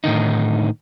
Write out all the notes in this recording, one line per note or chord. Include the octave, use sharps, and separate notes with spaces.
A2 D3 D#3 D#4